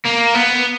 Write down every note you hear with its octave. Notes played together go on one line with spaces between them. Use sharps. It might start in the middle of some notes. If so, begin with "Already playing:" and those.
A#3
B3